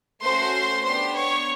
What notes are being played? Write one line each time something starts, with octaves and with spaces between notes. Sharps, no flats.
A3 C#4 F#4 C5 C6
B3 D4 G4 C5 C6
C#5 C#6